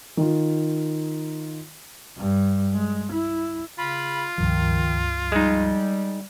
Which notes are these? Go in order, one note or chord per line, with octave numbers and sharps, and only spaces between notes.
D#3 F4
G2
G#3
E4
C#3 F4 B5
C#2 G2 D#3 F3
G3 G#3 D#4